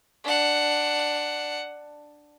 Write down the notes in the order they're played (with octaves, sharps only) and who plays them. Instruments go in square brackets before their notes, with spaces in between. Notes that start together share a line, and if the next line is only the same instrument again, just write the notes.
[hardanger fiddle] D4 F#5